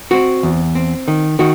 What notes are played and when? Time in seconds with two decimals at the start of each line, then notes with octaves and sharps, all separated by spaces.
0.11 C4 F#4
0.43 E2
0.75 C4
1.08 D#3
1.39 D#3 F#4